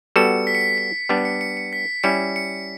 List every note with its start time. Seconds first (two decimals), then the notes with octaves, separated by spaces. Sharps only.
0.16 G3 B3 F#4 A4 C#7
0.47 B6
0.55 C#7
0.61 B6
0.78 B6
1.09 G3 B3 D4 C#7
1.18 B6
1.25 C#7
1.41 C#7
1.57 C#7
1.73 B6
2.03 G3 C#4 E4 C#7
2.36 C#7